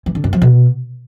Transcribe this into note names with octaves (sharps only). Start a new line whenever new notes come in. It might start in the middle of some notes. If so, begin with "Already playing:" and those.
E3
D3
F#2
F3
B2